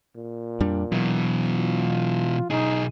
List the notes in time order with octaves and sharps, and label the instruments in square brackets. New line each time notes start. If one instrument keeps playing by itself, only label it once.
[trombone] A#2
[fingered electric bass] F2 G3 D4
[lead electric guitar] B2 E3 [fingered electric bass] F#3
[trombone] F4
[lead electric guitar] B1 G#4 [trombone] D#4